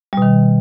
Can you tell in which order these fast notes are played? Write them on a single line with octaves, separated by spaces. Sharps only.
G3 B2 D#3